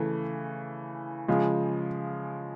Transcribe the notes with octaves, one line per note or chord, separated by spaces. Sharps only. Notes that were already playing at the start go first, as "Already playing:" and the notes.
Already playing: C#3 E3 A3
C#3 F3 G#3